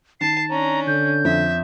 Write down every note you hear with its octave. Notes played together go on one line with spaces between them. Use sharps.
D#3 A5 C7
C#4 D4 A#5
D3 G6
F2 E5